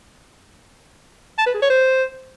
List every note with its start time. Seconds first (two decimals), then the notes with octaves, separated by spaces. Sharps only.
1.38 A5
1.46 B4
1.54 G#4
1.62 C#5
1.70 C5